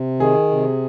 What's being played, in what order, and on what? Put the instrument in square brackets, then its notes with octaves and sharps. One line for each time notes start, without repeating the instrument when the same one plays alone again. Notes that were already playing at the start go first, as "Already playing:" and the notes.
Already playing: [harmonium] C3
[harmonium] D#3 [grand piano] G#4
[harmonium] C3